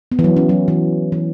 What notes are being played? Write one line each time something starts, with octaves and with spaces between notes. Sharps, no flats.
B3
E3
F#3
C#4
F#3
E3
E3